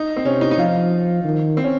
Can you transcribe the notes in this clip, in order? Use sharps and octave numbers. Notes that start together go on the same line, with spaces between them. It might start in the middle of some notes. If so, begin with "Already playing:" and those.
Already playing: D#4
C4
C3 C#4
D#4
D#4
F3 F4
D#3
C4
C#4